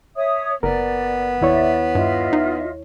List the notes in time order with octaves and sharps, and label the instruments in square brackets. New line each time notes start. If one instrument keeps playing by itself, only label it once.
[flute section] C#5 E5 D#6
[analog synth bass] F#1 [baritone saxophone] B3 [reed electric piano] A#4 [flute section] D5
[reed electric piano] D#2 E4 C#5 [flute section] D5 E5
[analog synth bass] G2 [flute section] F4 D#5 E5
[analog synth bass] D#4